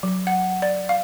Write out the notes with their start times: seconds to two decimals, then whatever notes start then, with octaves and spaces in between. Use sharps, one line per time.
0.03 F#3
0.27 F#5
0.62 D5
0.89 F5